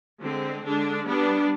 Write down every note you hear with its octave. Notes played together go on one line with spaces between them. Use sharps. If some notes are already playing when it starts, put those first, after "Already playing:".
D3 G#3 C4
D3 G#3 D4
G3 B3 D4